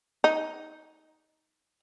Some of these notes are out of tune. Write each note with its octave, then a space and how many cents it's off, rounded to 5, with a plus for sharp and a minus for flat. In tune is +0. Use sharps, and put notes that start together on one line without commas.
D#4 +15